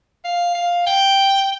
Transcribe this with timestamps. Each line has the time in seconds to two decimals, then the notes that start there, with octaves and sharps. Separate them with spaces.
0.25 F5
0.55 F5
0.87 G5